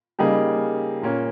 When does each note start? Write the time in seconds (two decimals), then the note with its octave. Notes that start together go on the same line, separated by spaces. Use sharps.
0.19 C#3 G3 A#3 D#4 G#4
1.02 A#2 A#3 C#4